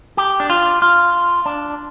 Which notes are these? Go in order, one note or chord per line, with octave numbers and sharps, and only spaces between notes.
G4
D4
F4
F4
D4